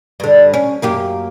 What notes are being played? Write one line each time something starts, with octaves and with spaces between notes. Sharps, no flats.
G2 D3
C#4
F#2 A#3 G4